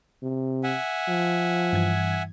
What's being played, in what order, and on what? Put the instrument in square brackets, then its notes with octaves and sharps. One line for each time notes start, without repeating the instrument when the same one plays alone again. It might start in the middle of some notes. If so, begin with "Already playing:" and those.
[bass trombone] C3
[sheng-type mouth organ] E5 F#5 G#5
[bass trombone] F3
[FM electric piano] G2 E3 G#6